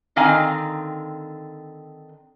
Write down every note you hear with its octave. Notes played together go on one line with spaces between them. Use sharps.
D3 D#3 C4 F5 G#5 A#5